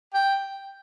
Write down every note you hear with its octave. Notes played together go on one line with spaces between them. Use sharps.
G5